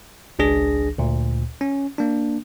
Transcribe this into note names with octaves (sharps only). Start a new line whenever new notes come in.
G#1 C#2 D4 G#4 A#6
D2 A#2
C#4
A#3 D4